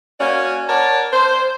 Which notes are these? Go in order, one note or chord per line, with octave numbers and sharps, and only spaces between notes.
A#3 C#4 F#4 D5 G#5
A#4 C#5 D5 F#5 A5
C5